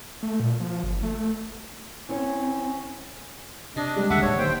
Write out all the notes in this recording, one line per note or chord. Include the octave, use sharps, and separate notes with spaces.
A3
A#2
F3
G1
A3
C4 C#4 E4 C#5
C3 D4 D#5
G3 G#3
D#2 D3 E5 F#5
D1 C#5
D#2 C5 G5